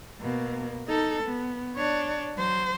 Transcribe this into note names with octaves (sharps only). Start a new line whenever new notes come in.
B2 A#3
D#4 A4
B3
D4 C#5
F#3 C5